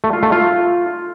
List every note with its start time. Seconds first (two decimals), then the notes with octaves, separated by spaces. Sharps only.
0.04 A3
0.13 F4
0.23 A3
0.32 F4